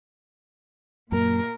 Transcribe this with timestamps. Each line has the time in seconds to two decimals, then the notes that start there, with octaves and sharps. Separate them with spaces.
1.12 F#2 A#2 A#3 A#4